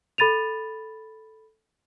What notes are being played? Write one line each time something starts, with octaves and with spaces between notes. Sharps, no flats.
A4 B5 A6 D#7 F7